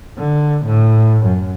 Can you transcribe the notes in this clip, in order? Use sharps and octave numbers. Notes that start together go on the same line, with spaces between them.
D3
A2
F#2